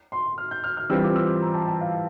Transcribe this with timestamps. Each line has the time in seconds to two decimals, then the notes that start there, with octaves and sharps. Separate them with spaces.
0.12 C6
0.38 F6
0.51 G6
0.64 F6
0.77 F6
0.90 E3 G3 C4 F4 E6
1.03 D6
1.16 E6
1.42 A#5
1.54 A5
1.68 A5
1.81 F5